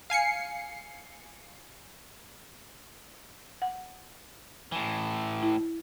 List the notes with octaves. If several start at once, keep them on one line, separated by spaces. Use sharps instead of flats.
F5 G#5 C7 C#7
F#5
A2 E3
E4